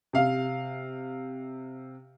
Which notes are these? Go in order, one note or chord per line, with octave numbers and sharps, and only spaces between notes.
C3 F5